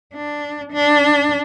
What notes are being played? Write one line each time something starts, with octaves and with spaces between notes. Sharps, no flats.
D4
D4